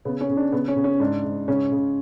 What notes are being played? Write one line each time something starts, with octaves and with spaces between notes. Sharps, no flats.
C#3 B3
C#4
C#3
D4
C#3 B3
C#4
C#3
C#4
G#2 D4
G#2
C#3 C#4
C#3